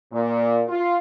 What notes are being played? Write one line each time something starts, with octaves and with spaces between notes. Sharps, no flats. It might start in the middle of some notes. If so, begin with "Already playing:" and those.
A#2
F4